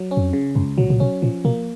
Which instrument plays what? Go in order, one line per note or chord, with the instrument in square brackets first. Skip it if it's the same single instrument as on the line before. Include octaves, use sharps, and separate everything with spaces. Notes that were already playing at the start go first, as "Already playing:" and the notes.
Already playing: [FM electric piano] F#3
C#4
[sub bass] F#2
F2
[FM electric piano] C#3
[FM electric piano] C#2 [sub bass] F#2
[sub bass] A#2 [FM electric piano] F#3
[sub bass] A#2
[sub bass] B2 [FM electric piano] C#4
[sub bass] A#2 [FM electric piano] F3
[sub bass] B2 [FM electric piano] A#3